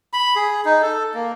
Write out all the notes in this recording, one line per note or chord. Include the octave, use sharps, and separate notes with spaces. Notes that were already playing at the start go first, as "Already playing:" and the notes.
B5
G#4
D#4
A4
A#3